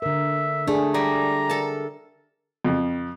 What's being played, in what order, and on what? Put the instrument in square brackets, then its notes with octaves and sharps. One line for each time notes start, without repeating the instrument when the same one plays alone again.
[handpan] D3 A#4 [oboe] E5
[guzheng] A3 [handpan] D4 G#4
[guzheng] G3 [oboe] A#5
[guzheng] A4 A5 [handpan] A#4
[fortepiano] F2